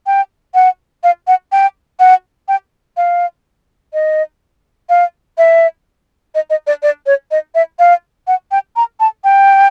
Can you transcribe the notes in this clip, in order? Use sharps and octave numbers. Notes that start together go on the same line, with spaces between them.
G5
F#5
F5
F#5
G5
F#5
G5
F5
D#5
F5
E5
D#5
D#5
D5
D5
C#5
D#5
E5
F5
F#5
G5
A#5
A5
G5